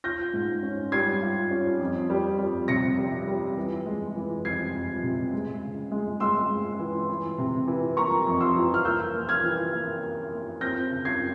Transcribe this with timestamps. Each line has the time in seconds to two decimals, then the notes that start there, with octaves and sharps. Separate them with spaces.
0.04 F4 G6 A#6
0.33 G#2
0.63 C#4
0.92 G3 G#6 C7
1.22 F4
1.51 C#4
1.80 F2
2.10 G3
2.39 G3
2.68 C3 A#6 C#7
2.98 G3
3.27 G3
3.57 E3
3.86 G#3
4.15 E3
4.45 F2 G#6 C7
4.74 F2
5.03 C3
5.32 G#3
5.63 C#3
5.91 G#3
6.20 G#3 C6 E6
6.50 G#3
6.79 E3
7.09 E3
7.38 C3
7.67 E3
7.97 A#3 A#5 C#6
8.27 F2
8.40 C6 E6
8.56 E3
8.74 F6
8.85 A#3 E6 G6
9.15 A#3
9.29 F6 G#6
9.44 E3
9.73 A#3
10.02 A#3
10.32 A#3
10.61 C4 G6 A#6
10.91 C#3
11.05 G#6 C7